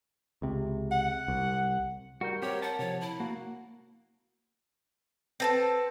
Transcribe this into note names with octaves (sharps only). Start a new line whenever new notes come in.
C#2 C3
F#5
C2
G3 F#4 A#4 G6
C4 G4 A#4 C#5
F#5 A5
C3 F3 C#5
E4
A#3 F#4
C4 A4 B4 A5